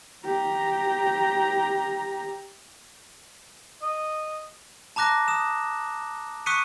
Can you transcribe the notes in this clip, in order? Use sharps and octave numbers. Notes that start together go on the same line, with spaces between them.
G4 A#5
D#5
A5 A#5 D6 F#6 A#6
D#6 E7
C#6 D#6 F#6 B6 C#7 D#7